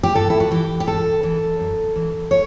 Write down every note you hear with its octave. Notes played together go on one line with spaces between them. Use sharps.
G4
G2 A4
E4
F#4
E3 G4
G4
G2 A4
E3
F#2
E3
C#5